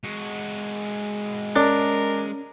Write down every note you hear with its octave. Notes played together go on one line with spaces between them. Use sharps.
G#3 F#4
C#4 D4 A#4